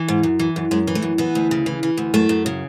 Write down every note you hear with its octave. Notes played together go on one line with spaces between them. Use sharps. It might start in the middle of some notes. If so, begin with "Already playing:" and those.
Already playing: E3
G#2
F#2
E3
F#2
F#2 G#3
E3
A3
F#2
E3 B3
D2
C#3
E3
E3
D2
F#2 A3
F#2
C#3